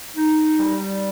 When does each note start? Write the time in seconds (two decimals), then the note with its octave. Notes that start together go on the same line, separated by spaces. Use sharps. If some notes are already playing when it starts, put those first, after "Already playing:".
0.16 D#4
0.58 G3